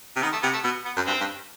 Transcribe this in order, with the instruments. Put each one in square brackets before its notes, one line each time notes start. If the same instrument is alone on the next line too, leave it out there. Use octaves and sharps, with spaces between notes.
[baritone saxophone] C3
[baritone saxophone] D#3 [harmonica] B3
[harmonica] A3
[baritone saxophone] C3 [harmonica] B3
[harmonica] A3
[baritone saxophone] B2 [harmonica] B3
[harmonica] B3
[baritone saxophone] F#2
[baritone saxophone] G2 [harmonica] C4
[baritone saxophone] G2